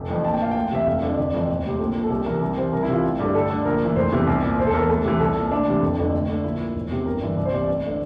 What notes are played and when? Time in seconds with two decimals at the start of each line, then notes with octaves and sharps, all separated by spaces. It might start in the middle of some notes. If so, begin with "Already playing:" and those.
Already playing: F1
0.09 F2 E3
0.24 A#1 A5
0.34 G5
0.40 A#2 F5
0.51 D2 G5
0.71 C3 E3 E5
0.86 F1 F5
1.02 F2 D3
1.17 F1 D5
1.33 F2 E3
1.48 E1
1.65 D2 C3
1.79 A#1 A4
1.96 A#2
2.04 A4
2.10 C2 G4
2.26 C3 E3 A#4
2.41 C2 A#4
2.57 C3 E3 C5
2.73 C2 A#4
2.83 E4
2.88 C3 E3 F4
3.03 A1
3.19 G2 D3 G4
3.34 D2 A4
3.50 D3
3.65 A#1 A#4
3.80 A2 E3
3.96 F1 C5
4.12 E2 C3 E3
4.27 C2
4.42 A#2
4.59 E1 C5
4.67 A4
4.74 E2 E3 A#4
4.89 D2 A4
5.04 C3 E3
5.20 C2 A4
5.36 A#2
5.51 D2 D4
5.67 C3 E3
5.82 F1
5.98 F2 D3
6.13 D2
6.29 D3
6.44 A#1 E4
6.59 A#2
6.76 E1
6.90 E2 C3
7.06 G1 A#4
7.21 G2 E3
7.36 C2 D5
7.45 C5
7.52 C3 E3 D5
7.68 A1
7.86 D3